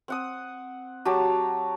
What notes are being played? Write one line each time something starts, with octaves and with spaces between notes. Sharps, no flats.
C4 F#5 D#6
F#3 G4 A5 A#5